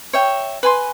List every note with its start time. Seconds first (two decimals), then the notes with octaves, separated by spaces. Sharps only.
0.13 C#5 E5 G5
0.63 B4 G#5 C6